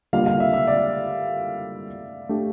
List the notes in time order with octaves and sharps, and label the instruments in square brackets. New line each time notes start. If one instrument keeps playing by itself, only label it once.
[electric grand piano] D3 G3 A#3 F4 [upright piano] F5
[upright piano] F5
E5
E5
D5
[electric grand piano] A3 D4 G4